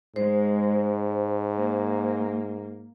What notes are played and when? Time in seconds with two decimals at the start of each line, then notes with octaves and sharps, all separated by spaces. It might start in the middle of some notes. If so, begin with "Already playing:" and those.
0.16 G#2 G#3 C5
1.59 A#3